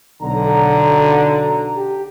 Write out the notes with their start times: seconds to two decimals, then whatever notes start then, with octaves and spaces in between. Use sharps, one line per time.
0.23 B1 D3 A#5
1.77 G4